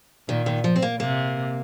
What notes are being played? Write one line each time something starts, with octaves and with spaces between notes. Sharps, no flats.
A#2 D#3
D#3
F3
C4
A#3
C3 A#3